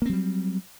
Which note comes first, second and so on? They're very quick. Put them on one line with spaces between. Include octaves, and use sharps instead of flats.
A#3 C4 F#3 G3